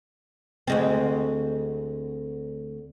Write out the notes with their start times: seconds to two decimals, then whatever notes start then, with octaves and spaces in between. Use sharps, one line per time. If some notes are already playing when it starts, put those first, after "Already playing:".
0.67 D2 G#3 C4